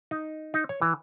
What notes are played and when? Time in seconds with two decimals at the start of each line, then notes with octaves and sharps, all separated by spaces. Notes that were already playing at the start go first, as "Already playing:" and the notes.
0.11 D#4
0.54 D#4
0.69 C#5
0.82 E3